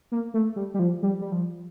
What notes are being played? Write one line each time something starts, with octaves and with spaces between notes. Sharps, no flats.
A#3
A3
G3
G3
F3
G3
G3
F3